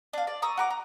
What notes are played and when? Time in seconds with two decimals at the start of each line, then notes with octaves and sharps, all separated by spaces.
0.13 D4 F5
0.27 D5
0.42 A#5 C#6 D#6 E6
0.57 F#4 A#5 D6
0.70 A#5